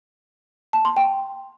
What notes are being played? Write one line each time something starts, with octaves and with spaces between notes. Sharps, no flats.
A5
C6
G5